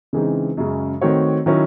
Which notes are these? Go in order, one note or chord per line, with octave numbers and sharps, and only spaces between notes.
C#3 E3 G#3 C4 D#4
F#2 C#3 G#3
D#3 A3 C4 F#4 C#5
D#3 F#3 C#4 E4